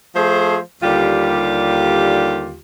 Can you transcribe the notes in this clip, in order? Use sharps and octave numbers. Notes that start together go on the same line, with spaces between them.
F3 A3 G#4 C5
D#2 D3 G3 F4 G4